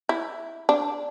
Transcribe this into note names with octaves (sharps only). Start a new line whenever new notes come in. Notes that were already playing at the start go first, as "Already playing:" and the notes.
E4
D4